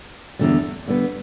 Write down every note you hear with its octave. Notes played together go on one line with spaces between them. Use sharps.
E2 D3 G3
D3 G3 B3